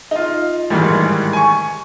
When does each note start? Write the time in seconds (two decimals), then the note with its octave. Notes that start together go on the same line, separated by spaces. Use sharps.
0.11 D#4 F4
0.70 A1 G#2 D#3 E3 G3 G#3
1.33 G#5 C#6